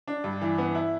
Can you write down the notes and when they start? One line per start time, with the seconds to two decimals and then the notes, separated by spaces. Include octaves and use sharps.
0.08 D4
0.24 G2
0.41 E3
0.58 B3
0.75 E4